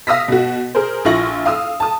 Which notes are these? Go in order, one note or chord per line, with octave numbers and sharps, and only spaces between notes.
F5 D#6 E6 A#6 B6
B2 F#4
G#4 A#4 C5
A#1 E4 F4 C#6 A#6 F#7
F5 D#6 E6
A5 D#6